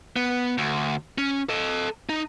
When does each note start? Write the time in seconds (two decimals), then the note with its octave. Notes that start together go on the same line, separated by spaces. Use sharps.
0.16 B3
0.58 D2
1.18 C#4
1.49 A4 D#5
2.09 D#4